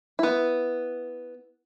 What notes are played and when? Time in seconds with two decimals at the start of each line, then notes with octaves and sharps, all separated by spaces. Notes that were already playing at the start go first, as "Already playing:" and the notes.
0.19 B3 E4